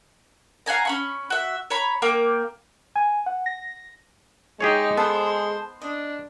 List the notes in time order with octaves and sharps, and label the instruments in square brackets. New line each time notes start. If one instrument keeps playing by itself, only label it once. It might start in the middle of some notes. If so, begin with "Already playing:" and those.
[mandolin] F5 F#5 G#5 A#5
C#4 B5 C#6
F#4 E5
C#5 A#5 B5
A#3 G5 D6
[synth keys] G#5
F#5
A#6
[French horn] G#3 [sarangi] D#4 [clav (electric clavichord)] G4 G#4 C#5
[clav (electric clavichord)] B3 [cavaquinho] A4 [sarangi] C5
[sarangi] D4 [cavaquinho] D#5